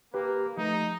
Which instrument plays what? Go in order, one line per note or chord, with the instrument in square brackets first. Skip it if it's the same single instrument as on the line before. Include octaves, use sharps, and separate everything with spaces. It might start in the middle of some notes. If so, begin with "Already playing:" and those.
[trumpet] A#3 [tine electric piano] G4 B4
[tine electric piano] F3 A3 [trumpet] D#4